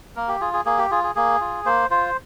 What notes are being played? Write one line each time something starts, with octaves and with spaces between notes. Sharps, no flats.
A#3 A#4
G4
F4 G#4
G#4
A#3 G#4
G4
F4 G#4
G#4
A#3 G#4
F4
A#3 C5
F4 C5